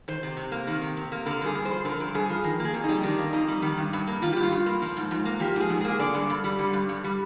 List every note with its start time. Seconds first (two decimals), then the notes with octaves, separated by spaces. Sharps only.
0.08 D#3 C5
0.23 C3
0.37 C3
0.52 A#3
0.67 D#3
0.81 C3
0.97 C3
1.12 A#3
1.26 D3 A#4
1.41 G2 G#4
1.55 G2
1.65 C5
1.71 F3
1.85 D3 A#4
2.00 G2
2.14 G2 G#4
2.29 F3
2.44 D#3 A#4
2.60 A#3
2.65 G#4
2.74 F2
2.84 G3 D#4
3.03 D#3 D4
3.19 A#3
3.33 F2 D#4
3.48 G3
3.62 D#3
3.77 G2
3.93 G2
4.07 A#3
4.22 D#3 F4
4.33 G2 G4
4.43 F4
4.52 G2
4.66 A#3
4.82 F3
4.97 G#2
5.11 G#2
5.25 A#3
5.40 F3 G4
5.56 G#2 G#4
5.70 G#2
5.81 A#3 G#4
5.99 D3 D5
6.14 G2
6.30 G2
6.44 G3
6.59 D3
6.73 G2
6.89 G2
7.04 G3